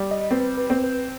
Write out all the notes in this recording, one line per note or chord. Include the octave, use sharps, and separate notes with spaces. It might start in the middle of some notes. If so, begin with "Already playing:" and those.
Already playing: G3
D#5
C4 B4
B4
C4
B4